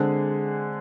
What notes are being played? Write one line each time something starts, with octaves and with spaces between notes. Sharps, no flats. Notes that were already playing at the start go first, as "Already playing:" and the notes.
Already playing: D3 G#3 C4 G#4